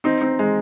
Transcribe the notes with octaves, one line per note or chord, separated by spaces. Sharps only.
C4 D#4
C4 D#4
G#3